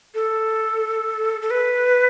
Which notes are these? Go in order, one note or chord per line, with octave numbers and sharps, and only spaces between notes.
A4
A4
B4